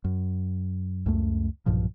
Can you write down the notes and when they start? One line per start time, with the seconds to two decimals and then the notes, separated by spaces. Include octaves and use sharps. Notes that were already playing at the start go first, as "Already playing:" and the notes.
0.04 F#2
1.06 C#2 F#2 A3
1.66 B1 G2 A#2 F3